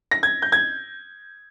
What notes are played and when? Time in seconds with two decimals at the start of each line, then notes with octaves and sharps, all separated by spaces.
0.11 A#6
0.23 G#6
0.42 G6
0.52 G#6